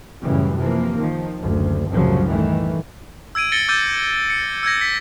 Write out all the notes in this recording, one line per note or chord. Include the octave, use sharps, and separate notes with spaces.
F#2 A2 C#3 E3 G3
C3 E3 F3 A#3
D#3 F3
F#1 D2
C2 F#2 A2 C#3 F3 F#3
A2 D#3 E3 A3
E6 G#6 D7 D#7
A6 A#6 C#7 G7
D6 E6 G6 A6 D#7 G7
C#7
E6 G6 G#6 A#6
B6